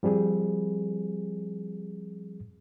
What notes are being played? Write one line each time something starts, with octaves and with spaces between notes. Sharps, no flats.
F3 G3 C4 G#4